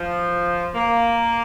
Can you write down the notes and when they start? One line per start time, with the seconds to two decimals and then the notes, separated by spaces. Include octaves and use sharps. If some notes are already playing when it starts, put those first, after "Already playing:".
Already playing: F3
0.75 A#3